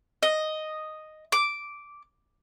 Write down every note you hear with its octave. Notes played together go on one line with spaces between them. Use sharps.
D#5
D6